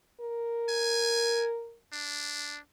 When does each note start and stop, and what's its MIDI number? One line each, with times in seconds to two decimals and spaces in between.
0.20 1.77 70
0.69 1.47 80
1.93 2.59 62